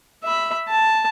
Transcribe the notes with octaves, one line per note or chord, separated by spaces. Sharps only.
E5 B5
A5